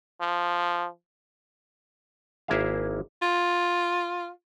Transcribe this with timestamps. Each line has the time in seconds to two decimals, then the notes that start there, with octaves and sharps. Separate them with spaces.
0.21 F3
2.48 G#1 A#3 E4 G#4 E5 F5
3.22 F4